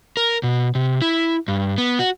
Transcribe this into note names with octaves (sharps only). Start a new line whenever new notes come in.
A#4
B2
C3
E4
G2
B3
F#4